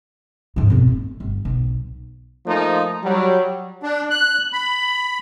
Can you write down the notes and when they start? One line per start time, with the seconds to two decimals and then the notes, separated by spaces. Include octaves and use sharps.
0.56 G#2 F3
0.70 F2 B2
0.87 A3
1.20 G1
1.45 B1
2.46 F3 A3 A#3 D#4
3.03 F#3 G3
3.83 D4
4.10 F#6
4.53 B5